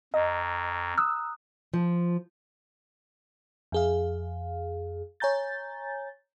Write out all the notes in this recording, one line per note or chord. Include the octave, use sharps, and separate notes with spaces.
F2 D#5 A#5
D#6 E6 F#6
F3
F2 G#4 F5
C#5 G#5 A#5 G6 A6